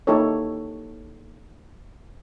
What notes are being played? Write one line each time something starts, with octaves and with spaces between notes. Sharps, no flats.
A#3 D#4 E4 G4 A4 C#5